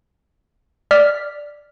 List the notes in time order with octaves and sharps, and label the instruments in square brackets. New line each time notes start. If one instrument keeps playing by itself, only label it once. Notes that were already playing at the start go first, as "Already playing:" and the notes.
[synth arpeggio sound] D5 F6 B6